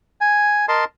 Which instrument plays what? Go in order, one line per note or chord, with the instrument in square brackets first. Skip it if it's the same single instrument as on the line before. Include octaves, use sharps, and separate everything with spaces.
[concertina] G#5
A#4 D#5 A5 C6